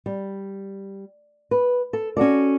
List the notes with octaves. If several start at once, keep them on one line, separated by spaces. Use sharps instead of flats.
G3
B4
A4
C#4 F#4 A4 D5